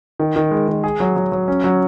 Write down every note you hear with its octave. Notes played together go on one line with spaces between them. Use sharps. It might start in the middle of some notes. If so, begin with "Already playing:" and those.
D#3
D#3
G#3
D#3
G#4
F#3
F#3
F#3
C#4
F#3